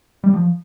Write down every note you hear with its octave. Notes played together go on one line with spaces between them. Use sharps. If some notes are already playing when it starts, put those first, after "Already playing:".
G3
F3